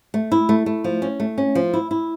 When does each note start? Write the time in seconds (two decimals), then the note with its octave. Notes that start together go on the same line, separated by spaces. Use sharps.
0.14 A3
0.32 E4
0.49 A3
0.66 A3
0.84 F3
1.02 C#4
1.20 A3
1.38 C#4
1.55 F3
1.73 E4
1.91 E4